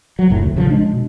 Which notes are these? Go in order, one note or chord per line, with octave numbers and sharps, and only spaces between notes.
F#3
F1 A2
D2
A1 C#3 F3
G#3 D4
B2